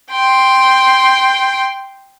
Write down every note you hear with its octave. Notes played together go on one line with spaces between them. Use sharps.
G5 C6